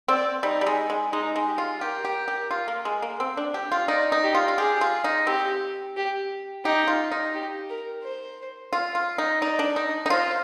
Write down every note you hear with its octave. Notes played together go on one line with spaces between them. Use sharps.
C4 D5
G3 D#4
G3
G#3
G#3
G#3 D#4
G#3
G4
F4
G4 A#4
G4
G4
F4
A#3
G#3
A#3
C4
D4
G4
F4
D#4 D5
D#4
G4
F4
F4
G4 G#4
F4
D#4
C4 G4
G4
D#4 G4
F4
D#4
G4
A#4
C5
F4
F4
D#4
D#4 D5
D4
D#4
D#4
F4 C5